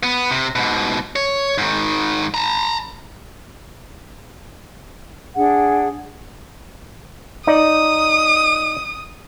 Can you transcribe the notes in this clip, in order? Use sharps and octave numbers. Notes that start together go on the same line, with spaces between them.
B3
C3
G#2 B2
C#5
G#2 D#3
A5 A#5
D4 G#4 F#5
D#4 D5 D#6